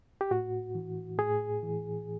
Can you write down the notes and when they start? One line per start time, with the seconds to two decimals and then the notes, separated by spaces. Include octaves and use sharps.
0.21 G4
0.31 A2 F#4
0.75 E3
1.18 A2 G#4
1.63 E3